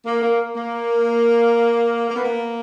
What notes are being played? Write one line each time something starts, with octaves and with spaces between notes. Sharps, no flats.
A#3
A#3
A#3
A#3
B3
A#3